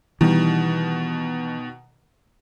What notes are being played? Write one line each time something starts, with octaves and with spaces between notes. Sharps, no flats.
B2 D#3 E3 G3